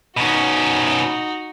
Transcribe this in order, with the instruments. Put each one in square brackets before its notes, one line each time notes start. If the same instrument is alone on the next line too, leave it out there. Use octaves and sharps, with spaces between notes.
[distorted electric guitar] B2 C#4 [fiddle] D#4 F#4